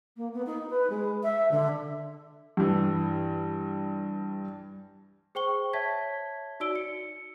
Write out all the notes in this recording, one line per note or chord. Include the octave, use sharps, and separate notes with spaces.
A#3
B3
D#4
B4
G#3
E5
D3
G2 E3
G#4 C5 G5 C#6 G7
C#5 E5 A5 G#6 B6
D#4 F#4 D5 E6 D7 G7
C#7